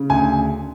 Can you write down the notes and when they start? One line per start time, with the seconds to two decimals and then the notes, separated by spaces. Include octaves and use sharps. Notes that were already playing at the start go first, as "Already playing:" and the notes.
Already playing: C#3
0.10 D2 G#5